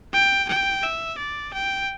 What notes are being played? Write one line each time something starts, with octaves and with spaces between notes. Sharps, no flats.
G5
G5
E5
D5
G5